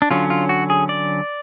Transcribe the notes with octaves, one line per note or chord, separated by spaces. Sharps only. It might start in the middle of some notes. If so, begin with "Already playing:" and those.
D4
D3 F#3 C#4 F4
F4
F#4
G#4
D5